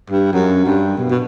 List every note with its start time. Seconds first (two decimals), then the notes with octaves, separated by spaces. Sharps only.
0.10 G2
0.33 F#2
0.65 G2
0.97 B2
1.10 B2